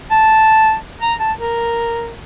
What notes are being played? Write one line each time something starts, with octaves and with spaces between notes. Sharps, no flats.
A5
A#5
A5
A#4